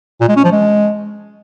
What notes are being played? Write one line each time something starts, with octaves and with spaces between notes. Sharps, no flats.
A#2
G#3
C#4
F3
G#3